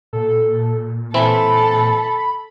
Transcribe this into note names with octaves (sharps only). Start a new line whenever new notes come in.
A#2 A4
E3 C4 A4 B5